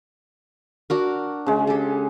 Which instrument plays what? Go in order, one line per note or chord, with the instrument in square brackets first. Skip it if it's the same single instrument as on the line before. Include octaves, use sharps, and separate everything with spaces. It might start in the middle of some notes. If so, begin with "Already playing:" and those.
[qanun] D4 F#4 A#4
[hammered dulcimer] C#3 G#3
[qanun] G4 A4